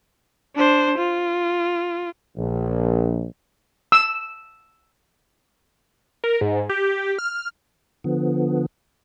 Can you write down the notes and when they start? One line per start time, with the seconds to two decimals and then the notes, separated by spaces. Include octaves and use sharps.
0.56 D4 C5
0.97 F4
2.37 A#1
3.92 E6
6.24 A#4
6.41 G#2
6.69 G4
7.19 F6
8.04 D3 F3 B3